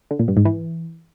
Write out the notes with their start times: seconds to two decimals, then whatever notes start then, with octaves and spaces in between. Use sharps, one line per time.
0.11 D3
0.19 A#2
0.28 G2
0.37 G#2
0.45 E3